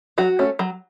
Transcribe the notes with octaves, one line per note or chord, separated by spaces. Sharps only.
F#3 F#4
A3 C#4
F#3